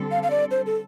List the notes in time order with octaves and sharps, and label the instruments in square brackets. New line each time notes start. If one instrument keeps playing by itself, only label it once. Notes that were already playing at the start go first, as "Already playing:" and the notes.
Already playing: [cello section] D3 G3 C4 A4
[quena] F5
F5
D5
C5
A4